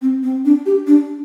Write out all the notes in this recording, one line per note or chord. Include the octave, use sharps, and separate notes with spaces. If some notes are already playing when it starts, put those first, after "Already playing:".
C4
C4
D4
G4
D4